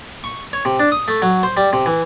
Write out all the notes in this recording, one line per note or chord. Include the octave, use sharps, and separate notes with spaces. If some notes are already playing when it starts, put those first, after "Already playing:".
C#6
C#5
C3
D4
D#6
A3
F#3
C5
G3
C3
E3